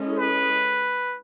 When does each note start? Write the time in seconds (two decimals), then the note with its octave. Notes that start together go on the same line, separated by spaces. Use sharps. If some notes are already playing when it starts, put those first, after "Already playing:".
Already playing: G#3 C#4 E4 A4 D#5
0.17 B4